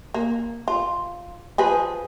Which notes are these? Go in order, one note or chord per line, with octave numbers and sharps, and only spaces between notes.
A#3
F4
F3 G#4 B4